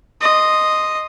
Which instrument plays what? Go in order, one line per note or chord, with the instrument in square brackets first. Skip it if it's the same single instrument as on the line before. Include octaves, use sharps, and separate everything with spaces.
[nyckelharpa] D#5 C6